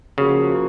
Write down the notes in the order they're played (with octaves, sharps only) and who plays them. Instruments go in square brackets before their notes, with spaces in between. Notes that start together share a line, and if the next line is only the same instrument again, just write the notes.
[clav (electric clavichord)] C#3 [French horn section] F3 A#3 C#4 F#4